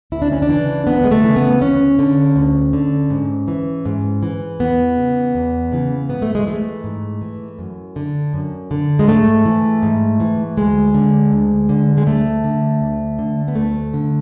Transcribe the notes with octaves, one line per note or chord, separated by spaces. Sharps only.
D2 E4
D4
C#4
D4
C#3 E3
D2 B3
G#3
A3
C#3 E3
B3
D2 C#4
D3
D2
D3
G#2
E3
G#2
E3
E2 B3
C#3 E3
E2
C#3 E3
G#2 B3
A3
G#3
E3 A3
G#2
E3
F#2
D3
F#2
D3
G#3
G#2 A3
E3
G#2
E3
D2 G#3
D3
D2
D3
G#3
D2 A3
D3
D2
D3
B3
D2 A3
D3